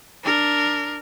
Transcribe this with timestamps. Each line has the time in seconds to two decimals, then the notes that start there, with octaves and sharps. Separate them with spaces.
0.24 D4 A#4